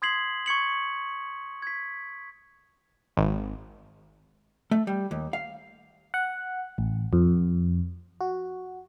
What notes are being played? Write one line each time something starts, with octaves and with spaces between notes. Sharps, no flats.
C6 D#6 G#6 B6 C7 F#7
C#6 G#6 C#7 F#7
G#6 B6
G#1
A3
G3
D#2
F5
F#5
A1
F2
F#4